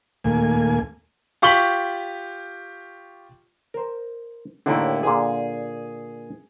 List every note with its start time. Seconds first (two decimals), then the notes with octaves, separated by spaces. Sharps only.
0.24 D#2 A#2 A3 A#3 G#5
1.42 F4 G4 C#6 B6 F#7 G7
3.74 A#4 C5
4.66 D#2 A2 D3 D#3 E4 G4
5.03 A#2 D3 G#4 C5